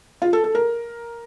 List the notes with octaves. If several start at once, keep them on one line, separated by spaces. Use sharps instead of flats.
F4
A4
A4
A#4